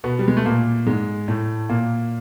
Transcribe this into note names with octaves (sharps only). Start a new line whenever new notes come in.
B2 B3
G3
G#3
A3
A#2 A#3
G#2 G#3
A2 A3
A#2 A#3